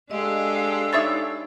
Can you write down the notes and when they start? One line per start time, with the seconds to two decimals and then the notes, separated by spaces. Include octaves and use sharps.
0.11 G#3 D4 G4 A4 D#5 F5 E6
0.93 D#4 B4 C#5 E5 A6